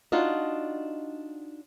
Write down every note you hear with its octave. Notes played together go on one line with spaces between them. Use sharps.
D4 D#4 F4 F#4 D#5